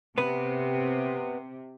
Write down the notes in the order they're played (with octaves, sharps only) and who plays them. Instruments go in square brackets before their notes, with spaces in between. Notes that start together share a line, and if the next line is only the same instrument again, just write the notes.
[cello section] C3 [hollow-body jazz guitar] B3 B4